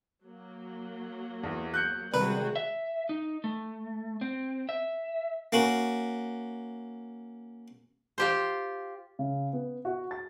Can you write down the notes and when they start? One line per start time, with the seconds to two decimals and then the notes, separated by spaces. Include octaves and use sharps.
0.22 F#3 A#3
1.43 E2
1.74 F#6 G6 C#7
2.14 C3 D#3 G3 G#3 C4 F#4 G#4 B4
2.56 E5
3.09 D#4
3.44 A3
4.21 C4
4.69 E5
5.52 A#3 C#4 F#4
8.18 F4 G4 C5
9.19 C#3
9.53 B3
9.85 F#4
10.11 A6